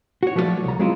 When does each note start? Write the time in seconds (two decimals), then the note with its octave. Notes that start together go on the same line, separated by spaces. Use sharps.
0.23 F#4 C#5
0.35 F3 F#3 A3 F#4 C#5 D5
0.65 C2 A#5
0.79 F#3 G#3 C4 E4 F4